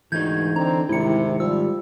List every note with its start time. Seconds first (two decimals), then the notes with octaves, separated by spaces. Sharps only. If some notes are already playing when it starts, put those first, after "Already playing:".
0.12 D2 G#2 E3 D#4 D#5 G6 G#6
0.56 D3 C4 A#5
0.89 C2 G#2 C3 D#3 E4 C#7
1.40 F3 G3 E6